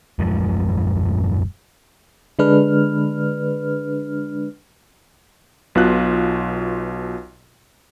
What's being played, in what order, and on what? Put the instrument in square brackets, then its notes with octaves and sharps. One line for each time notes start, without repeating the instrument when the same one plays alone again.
[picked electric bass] D#1 F#2 F3 G#3
[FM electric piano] D3 G#3 D4 B4 F6
[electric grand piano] B1 B2 F4 F#6